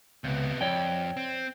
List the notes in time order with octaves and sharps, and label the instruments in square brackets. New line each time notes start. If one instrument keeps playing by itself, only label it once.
[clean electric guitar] C#2 [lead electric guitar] C3 B3
[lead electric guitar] F2 [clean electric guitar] C#5 D5 G5
[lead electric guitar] C4